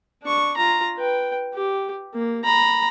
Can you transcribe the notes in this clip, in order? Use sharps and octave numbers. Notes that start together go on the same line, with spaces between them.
D4 C#6
F4 A#5
B4 G5
G4
A#3
A#5 B5